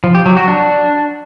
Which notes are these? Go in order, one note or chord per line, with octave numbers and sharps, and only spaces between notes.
F3
G4
F#3
F#4
D4